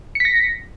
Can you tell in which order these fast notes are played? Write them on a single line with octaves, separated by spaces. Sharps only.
C#7 B6 A#6